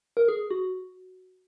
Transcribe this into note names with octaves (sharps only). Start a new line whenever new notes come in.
A#4
G#4
F#4